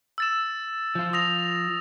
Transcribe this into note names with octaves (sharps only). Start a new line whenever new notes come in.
E6 A6 E7
F3 F4
D#6 A#6 F7